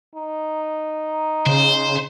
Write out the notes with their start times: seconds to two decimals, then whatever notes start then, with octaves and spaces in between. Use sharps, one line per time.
0.15 D#4
1.46 C#3 C5